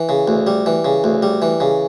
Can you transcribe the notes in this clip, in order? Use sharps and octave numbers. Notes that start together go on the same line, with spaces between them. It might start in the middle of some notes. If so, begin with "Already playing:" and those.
Already playing: E3
C#3
D2
G3
E3
C#3
D2
G3
E3
C#3